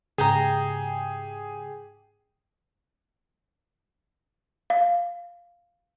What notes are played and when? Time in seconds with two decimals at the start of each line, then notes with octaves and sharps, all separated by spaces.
0.18 G#2 C#3 G4 G#4 G5 A#5
4.70 F5